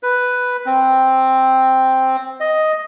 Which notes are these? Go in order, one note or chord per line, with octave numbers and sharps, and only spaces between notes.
B4
C4
D#5